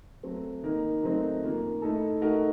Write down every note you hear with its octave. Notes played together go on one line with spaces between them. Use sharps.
F#3 A3 C4
D#3 A#3 D#4 A#4
D#3 F#3 A3 C4 D#4
F#2 D#3 A#3 F4
A2 A3 D#4 A4
A3 D#4 F#4 A#4